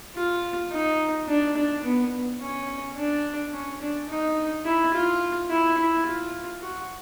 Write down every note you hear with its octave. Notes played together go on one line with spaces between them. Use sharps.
F4
D#4
D4
D4
B3
C#4
D4
C#4
D4
D#4
E4
F4
E4
E4
F4
F#4